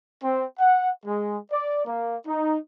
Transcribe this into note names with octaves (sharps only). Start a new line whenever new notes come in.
C4
F#5
G#3
D5
A#3
D#4